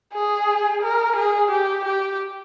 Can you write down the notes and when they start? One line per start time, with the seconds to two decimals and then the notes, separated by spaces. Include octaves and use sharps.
0.13 G#4
0.82 A#4
1.16 G#4
1.51 G4
1.85 G4